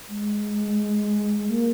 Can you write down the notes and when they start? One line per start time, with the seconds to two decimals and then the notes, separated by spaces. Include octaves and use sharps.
0.10 G#3
1.50 A#3